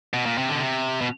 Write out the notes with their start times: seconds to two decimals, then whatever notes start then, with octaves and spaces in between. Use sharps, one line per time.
0.14 B2
0.26 A#2
0.38 C3
0.49 D3
0.55 B2
0.61 C3
1.01 B2